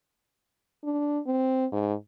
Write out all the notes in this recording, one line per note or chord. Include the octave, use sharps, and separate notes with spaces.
D4
C4
G#2